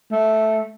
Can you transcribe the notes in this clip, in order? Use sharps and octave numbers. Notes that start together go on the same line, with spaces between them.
A3